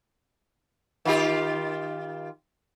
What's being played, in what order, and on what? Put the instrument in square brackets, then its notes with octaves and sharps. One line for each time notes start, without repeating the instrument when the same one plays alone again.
[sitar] D#3 F4 G4